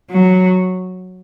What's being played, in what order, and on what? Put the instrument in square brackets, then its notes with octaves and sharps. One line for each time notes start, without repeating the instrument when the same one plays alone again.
[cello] F#3